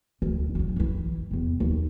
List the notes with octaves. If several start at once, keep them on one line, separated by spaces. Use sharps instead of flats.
D2
D3 F#3
E3 E4
E2 C3
D#2